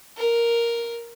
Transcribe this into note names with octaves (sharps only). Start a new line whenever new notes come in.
A#4